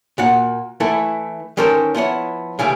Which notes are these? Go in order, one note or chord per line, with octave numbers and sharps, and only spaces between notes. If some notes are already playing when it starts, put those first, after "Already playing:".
A#2 F#4 F#5
E3 A3 E4 A4
D#3 E3 C#4 A4 A#4 C5
F3 B3 E4 C#5
C#3 E3 G3 A3